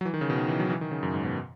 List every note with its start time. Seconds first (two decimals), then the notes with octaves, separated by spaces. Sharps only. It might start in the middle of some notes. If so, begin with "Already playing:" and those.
0.01 F#3
0.05 E3
0.14 D#3
0.21 C#3
0.30 B2
0.38 D#3
0.49 E3
0.60 F#3
0.70 E3
0.81 D#3
0.91 C#3
1.03 F#2
1.14 G#2
1.25 B2